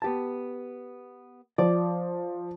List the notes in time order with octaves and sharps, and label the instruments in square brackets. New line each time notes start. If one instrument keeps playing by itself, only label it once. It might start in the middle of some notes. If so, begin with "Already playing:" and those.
[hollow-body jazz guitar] B3 G4 A5
[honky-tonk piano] F3 [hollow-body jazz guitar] D5